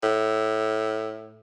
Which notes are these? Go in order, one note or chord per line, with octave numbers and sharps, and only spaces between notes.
A2